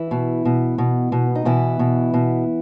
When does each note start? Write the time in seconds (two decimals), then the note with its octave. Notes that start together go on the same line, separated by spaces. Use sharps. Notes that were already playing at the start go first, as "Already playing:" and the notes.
Already playing: E3 E4
0.11 B2
0.45 B2
0.78 B2
1.12 B2
1.35 D#4
1.45 B2 E3 E4
1.79 B2
2.14 B2